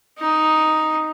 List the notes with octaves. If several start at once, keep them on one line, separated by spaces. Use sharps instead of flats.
D#4